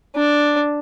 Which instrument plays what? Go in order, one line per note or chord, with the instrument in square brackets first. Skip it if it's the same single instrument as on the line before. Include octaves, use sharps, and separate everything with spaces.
[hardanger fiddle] D4